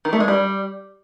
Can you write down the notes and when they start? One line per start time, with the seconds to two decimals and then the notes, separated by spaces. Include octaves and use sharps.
0.05 D#3
0.13 A3
0.20 G#3
0.28 G3